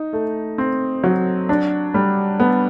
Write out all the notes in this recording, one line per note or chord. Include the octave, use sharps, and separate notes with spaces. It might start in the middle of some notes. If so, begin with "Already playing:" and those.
Already playing: D#4
A3
C4
F#3
D4
G3
B3